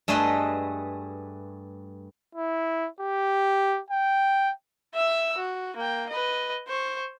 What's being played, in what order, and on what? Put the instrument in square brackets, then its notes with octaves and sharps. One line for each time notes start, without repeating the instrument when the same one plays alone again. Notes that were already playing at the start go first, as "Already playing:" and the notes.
[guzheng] G2 A3 G#4 B4 D#5 C6
[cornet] E4
G4
G5
[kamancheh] E5 E6
F#4
A#3 G5
B4 D#5
C5 C#6